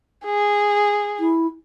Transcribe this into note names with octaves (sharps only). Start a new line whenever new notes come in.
G#4
E4